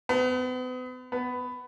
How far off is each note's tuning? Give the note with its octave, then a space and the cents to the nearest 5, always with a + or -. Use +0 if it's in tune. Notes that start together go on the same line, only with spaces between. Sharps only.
B3 +40
B3 +15